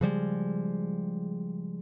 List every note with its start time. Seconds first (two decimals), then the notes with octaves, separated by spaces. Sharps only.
0.01 C#3 F3 G3 G#3